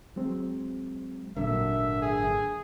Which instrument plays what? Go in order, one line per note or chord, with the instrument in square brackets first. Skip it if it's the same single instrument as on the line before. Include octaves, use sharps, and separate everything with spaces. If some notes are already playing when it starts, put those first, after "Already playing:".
[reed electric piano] F#3 G#3 C4
[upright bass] G#1 A#2 [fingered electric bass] D3 [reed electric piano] F#3 A#4 [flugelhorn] E5
[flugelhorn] G#4